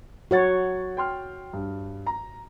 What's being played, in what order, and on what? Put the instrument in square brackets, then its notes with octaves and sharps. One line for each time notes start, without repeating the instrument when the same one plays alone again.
[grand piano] F#3 F#5 A6 [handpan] F#4 C#5
[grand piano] G5 C6 F6
G2
A#5